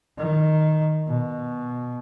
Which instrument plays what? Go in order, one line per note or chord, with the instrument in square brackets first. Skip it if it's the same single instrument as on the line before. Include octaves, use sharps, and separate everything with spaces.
[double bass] D#3
B2